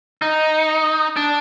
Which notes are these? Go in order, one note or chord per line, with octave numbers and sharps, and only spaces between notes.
D#4
D4